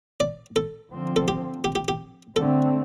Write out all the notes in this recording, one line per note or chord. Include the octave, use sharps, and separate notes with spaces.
D5
A4
D3 F3 C4
A4
G4
G4
G4
G4
D3 A3 C4 A4